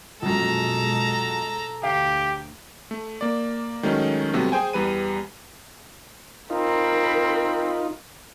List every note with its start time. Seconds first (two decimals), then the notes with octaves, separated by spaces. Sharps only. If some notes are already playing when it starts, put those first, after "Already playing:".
0.22 A#1 F#2 B2 G#3 A4 A#5
1.83 D2 G4 F5
2.91 A3
3.21 A#3 D5
3.83 D#3 F#3 G#3 A3 C#4 D#4
4.33 C3 F#3 G3 A3 B3
4.52 G#4 C5 G5 G#5
4.73 E2 G3 B4 D#7
6.50 C4 D#4 F4 A#4 B5